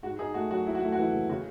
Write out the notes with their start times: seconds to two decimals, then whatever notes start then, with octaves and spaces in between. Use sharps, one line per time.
0.03 G#2 F#4
0.19 D#4 G#4
0.34 A3 F#4
0.50 F#3 F#4
0.67 D#2 E4
0.75 F#4
0.82 A3 E4
0.92 F#4
0.98 E3 E4
1.13 C#3
1.29 C#3 F#4